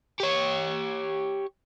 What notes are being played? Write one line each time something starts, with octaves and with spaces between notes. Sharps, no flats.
G4 C#5